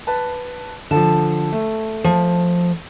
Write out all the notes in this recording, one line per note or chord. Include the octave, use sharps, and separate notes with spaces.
B4 A5
D3 F3 A5
A3
F3